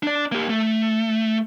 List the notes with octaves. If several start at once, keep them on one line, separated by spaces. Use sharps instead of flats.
D4 D5
A#3 G4
A3